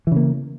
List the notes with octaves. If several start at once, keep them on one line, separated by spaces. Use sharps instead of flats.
C#3 E3 A#3